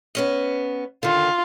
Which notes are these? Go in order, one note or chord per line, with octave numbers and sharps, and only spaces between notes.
B3 C#4 D#5
D3 D#3 F4